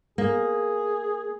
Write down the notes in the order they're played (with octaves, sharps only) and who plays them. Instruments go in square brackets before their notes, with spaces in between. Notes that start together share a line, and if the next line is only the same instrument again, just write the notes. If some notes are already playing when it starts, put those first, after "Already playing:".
[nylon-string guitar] A#3 [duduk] G#4